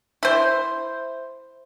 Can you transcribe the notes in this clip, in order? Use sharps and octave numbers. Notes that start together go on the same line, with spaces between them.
E4 C5